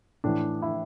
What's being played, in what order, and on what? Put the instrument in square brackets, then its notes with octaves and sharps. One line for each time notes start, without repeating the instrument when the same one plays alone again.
[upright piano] A2 E3 D4
E4